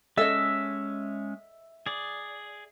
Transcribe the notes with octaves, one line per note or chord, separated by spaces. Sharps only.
G#3 C#4 A4 D#5 E5
G#4 D5